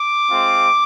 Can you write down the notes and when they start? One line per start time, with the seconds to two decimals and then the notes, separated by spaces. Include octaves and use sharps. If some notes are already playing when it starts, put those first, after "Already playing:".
Already playing: D6
0.30 G#3 C4 F4